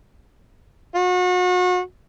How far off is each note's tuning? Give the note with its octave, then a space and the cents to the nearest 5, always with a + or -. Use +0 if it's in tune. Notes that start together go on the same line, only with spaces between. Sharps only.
F#4 -35